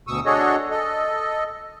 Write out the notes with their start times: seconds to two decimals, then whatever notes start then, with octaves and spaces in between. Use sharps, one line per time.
0.07 D2 B2 C#6 D#6 E6
0.26 D4 F#4 G#4 A4 C#5 D#5
0.71 A4 D#5